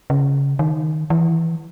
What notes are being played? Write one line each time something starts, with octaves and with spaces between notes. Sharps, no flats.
C#3
D#3
E3